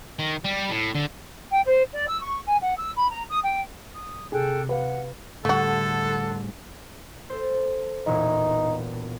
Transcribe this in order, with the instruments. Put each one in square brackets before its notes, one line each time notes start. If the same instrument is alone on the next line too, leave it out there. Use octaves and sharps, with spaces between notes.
[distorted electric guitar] D#3
G3
A2
D3
[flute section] G5
C5
D5
E6
C#6
G#5
F#5
E6
B5
A#5
D#6
G5
D#6
[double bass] C3 [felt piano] G#4 [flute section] A4 G5 F#6
[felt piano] B4 F5 [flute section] F#5
[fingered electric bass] A2 G3 [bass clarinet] D3 [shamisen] A3 F#4 [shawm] A4
[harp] A4 C5
[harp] E1 E2 A#2 [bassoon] D#4